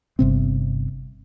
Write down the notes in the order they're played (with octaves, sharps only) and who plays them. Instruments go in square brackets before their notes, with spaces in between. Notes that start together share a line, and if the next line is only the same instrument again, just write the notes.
[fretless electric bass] G1 C3 C4